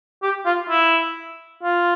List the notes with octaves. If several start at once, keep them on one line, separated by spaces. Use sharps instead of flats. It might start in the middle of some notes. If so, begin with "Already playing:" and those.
G4
F4
E4
F4